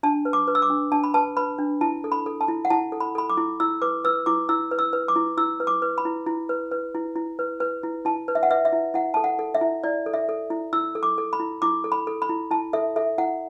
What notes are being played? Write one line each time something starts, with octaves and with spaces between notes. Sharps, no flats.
D4 A5
B4
D6
B4
E6
D6
D4
D4 A5
B5
B4 A5
B4 B5
D4
E4 A5
A4
B5
A4
A5
E4
F#5
E4 A5
A4
B5
A4 B5
D6
E4
E4 E6
B4 D6
B4 E6
E4 D6
E4 E6
B4
E6
B4
D6
E4
E4 E6
B4
D6
B4
B5
E4
E4
B4
B4
E4
E4
B4
B4
E4
E4 A5
B4
E5
F#5
B4 E5
E5
E4
E4 F#5
A4 A5
F#5
A4
E5
E4
E4 D5
A4
E5
A4
E4
E4 E6
A4
D6
A4
B5
E4
E4 D6
A4
B5
A4
B5
E4
E4 A5
A4 E5
A4 E5
E4 F#5